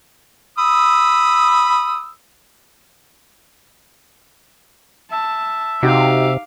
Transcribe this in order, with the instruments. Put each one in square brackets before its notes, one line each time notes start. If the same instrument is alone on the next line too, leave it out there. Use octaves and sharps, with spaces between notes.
[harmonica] B5 D#6 E6
[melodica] E5 [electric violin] A5
[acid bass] C3 [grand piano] D#4 F#4 G4 [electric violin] F5 D6